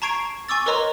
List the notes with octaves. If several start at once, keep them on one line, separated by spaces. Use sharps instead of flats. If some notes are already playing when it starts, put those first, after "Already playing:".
A5 A#5 C#6 G#6 C7 D7
G#5 C#6 D6 E6 A6
A#4 B4 C#5 D#5 A#5 C6